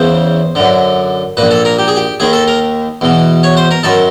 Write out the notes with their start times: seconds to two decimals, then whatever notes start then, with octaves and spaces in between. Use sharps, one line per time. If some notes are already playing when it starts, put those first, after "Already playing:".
Already playing: E2 C#3 E3 C5
0.55 F#2 D3
1.37 A#1 A#2 B4
1.51 A4
1.65 A#4
1.79 G4
1.88 G#4
1.96 G4
2.20 D#2 D#3 G#4
2.33 A4
2.48 A#4
3.01 E2 B2
3.43 C#5
3.57 C5
3.71 A#4
3.83 F#2 D#3 A4